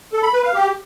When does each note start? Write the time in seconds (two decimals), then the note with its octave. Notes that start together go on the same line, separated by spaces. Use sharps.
0.13 A4
0.23 B5
0.33 B4
0.43 F5
0.54 G4